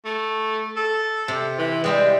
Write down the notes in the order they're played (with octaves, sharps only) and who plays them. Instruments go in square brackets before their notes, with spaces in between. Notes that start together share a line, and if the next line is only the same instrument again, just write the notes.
[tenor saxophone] A3
A4
[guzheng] C3
[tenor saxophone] E3
[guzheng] G3 C4 E4 [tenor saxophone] G#3